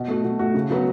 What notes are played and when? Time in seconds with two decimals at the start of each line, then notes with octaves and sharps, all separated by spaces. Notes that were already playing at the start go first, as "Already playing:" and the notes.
Already playing: B2
0.08 A3 F#4
0.24 B2
0.39 A3 F#4
0.54 C#3
0.70 F#3 B3 F#4